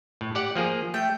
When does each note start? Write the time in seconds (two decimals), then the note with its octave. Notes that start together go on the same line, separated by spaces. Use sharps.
0.21 A2
0.35 G4 D5 F#5
0.55 F3 A#3 G#4
0.94 A3 G5